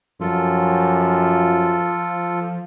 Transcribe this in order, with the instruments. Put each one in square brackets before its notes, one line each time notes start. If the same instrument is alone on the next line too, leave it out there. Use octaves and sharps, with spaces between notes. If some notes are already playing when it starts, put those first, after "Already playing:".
[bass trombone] F#2 [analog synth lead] F3 [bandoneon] F4 A4